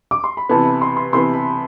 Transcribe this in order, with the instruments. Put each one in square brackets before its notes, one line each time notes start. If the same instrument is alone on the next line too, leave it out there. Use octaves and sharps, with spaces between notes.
[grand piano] D6
C6
B5
[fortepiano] C3 E3 B3 [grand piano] A5
[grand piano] B5
C6
C6
[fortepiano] C3 E3 B3 [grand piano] C6
[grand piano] B5